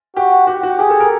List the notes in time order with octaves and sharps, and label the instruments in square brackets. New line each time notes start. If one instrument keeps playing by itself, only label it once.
[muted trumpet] F#4 [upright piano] G4
[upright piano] F#4 [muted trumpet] G4
[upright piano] F#4
[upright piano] G4 [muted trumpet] G#4
[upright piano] A4
A#4